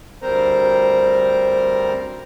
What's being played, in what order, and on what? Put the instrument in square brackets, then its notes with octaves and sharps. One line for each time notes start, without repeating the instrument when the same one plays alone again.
[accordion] D2 G3 C4 A#4 C5 A#5